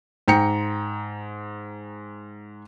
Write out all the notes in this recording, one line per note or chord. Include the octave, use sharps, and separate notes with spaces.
G#2 G5 A#5 C#7